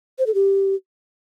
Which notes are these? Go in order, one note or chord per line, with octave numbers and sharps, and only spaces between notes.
C5
A4
G4